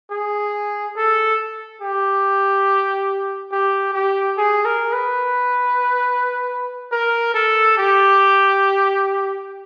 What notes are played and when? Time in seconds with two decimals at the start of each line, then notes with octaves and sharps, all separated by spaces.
0.11 G#4
0.97 A4
1.82 G4
3.52 G4
3.94 G4
4.37 G#4
4.65 A#4
4.93 B4
6.91 A#4
7.34 A4
7.77 G4